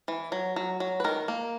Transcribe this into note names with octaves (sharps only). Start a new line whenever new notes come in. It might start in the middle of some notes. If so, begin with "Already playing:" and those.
E3
F#3
F#3
F#3
B4
D#3 A#4
A#3